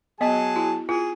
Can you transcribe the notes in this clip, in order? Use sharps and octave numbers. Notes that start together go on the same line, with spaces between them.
F#3 B3 G#4 D#5 A5
E4 F#4
F4 G#4